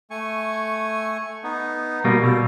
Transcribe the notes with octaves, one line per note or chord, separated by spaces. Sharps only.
A3 G#5 C#6
B3 D#4
B2 G3 A#3
B2 A4